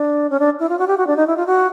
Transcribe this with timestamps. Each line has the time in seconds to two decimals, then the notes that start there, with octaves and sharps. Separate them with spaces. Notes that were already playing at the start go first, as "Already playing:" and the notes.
Already playing: D4
0.30 C#4
0.39 D4
0.60 E4
0.69 F4
0.79 F#4
0.87 G4
0.97 F#4
1.07 D4
1.16 D#4
1.27 E4
1.37 F4
1.47 F#4